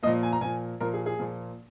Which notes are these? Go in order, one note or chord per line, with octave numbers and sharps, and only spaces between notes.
A#2 F3 A#3 D#5
G#5
A#5
A#2 F3 A#3 G#5
A#2 F3 A#3 A#4
G#4
G#4
A#2 F3 A#3